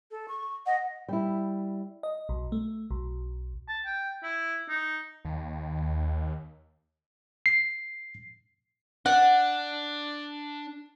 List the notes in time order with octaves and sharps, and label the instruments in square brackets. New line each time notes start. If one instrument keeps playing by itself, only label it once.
[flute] A4
C#6
[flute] D#5 [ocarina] F#5
[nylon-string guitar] G3 E4
[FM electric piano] D#5
B1
A3
B1
[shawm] A5
G5
E4
D#4
[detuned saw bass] D#2
[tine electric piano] C7
[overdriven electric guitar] D4 [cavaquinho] F#5